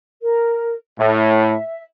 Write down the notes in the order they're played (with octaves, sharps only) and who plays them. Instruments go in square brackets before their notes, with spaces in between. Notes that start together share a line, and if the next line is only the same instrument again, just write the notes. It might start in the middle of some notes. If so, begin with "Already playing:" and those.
[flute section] A#4
[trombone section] A2 [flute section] E5